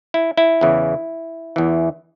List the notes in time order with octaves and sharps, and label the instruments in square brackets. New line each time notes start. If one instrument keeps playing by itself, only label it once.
[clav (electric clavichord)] E4
E4
E2 C#3 E3
E2 E3